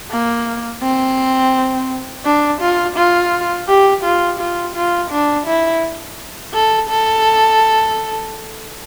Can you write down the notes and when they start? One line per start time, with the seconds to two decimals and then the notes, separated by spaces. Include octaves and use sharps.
0.11 A#3
0.82 C4
2.25 D4
2.61 F4
2.97 F4
3.68 G4
4.04 F4
4.40 F4
4.75 F4
5.11 D4
5.47 E4
6.54 A4
6.89 A4